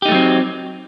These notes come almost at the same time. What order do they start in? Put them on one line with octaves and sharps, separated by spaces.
G4 D#4 A3 F#3 C4